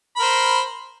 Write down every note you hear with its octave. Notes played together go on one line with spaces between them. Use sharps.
A#4 C5 B5